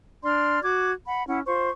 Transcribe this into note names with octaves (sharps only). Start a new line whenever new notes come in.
D4 D5 C6 F6
F#4 D6 G#6
F#5 B5
C#4 E4 F#5
F4 C5 C#6